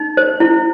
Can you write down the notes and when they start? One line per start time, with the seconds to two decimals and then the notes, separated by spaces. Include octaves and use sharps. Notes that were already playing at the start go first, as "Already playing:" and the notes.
Already playing: D#4
0.17 C5
0.40 E4